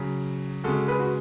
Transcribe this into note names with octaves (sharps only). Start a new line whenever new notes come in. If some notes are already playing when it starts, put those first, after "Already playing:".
Already playing: C#3 F#3
C#3 G#3 F#4 A4
G#4 B4
F#4